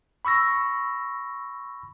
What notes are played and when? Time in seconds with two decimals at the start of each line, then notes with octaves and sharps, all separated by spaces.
0.25 B5 C#6 E6 A#6